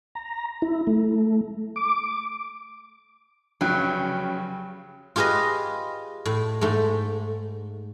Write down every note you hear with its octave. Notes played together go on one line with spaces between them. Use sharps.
A#5
E4
A3
D6
F1 C#3 F#3 G5
F4 G4 G#4 B4 D#5
A2
G#2 A3